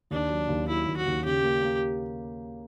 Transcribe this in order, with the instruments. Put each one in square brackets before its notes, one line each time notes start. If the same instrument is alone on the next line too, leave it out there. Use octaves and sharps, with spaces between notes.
[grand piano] D#2 [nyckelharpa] D4
[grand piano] F#3
D#2
[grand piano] F#3 [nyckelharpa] E4
[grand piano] D#2
[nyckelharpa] F#4
[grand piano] D#2
[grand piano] C#3 [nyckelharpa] G4
[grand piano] A#3
A#3